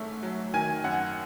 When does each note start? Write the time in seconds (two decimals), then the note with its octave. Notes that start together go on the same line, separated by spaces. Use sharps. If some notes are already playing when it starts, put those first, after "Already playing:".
Already playing: G#2 A3 C#4 E5
0.23 F#3
0.54 D#3 G#5
0.84 F#2 F#5